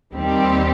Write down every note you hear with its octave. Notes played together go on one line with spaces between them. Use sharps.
D#2 D#3 G3 C4 G4